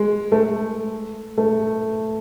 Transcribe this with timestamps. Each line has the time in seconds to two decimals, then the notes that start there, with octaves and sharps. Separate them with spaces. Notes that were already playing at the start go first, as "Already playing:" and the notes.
Already playing: G#3
0.32 A3
1.37 A3